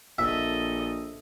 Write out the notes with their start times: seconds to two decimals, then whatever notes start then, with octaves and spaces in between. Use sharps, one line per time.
0.18 A#1 A4 D#5 E5